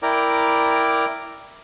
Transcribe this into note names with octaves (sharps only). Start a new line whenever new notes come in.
E4 A#4 D5 G5 A#5 D6